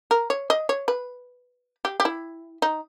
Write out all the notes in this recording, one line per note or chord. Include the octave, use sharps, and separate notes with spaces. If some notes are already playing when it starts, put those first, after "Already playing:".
A#4
C#5
D#5
C#5
B4
G4
G4
E4
D#4